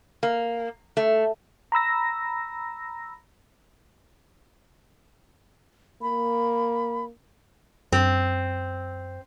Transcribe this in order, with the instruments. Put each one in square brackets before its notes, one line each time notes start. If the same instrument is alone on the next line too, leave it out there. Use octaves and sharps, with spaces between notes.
[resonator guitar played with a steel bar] A#3
A3
[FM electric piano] A#5 B5 E6 A#6
[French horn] A#3 [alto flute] B5
[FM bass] F#2 [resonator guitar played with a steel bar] C4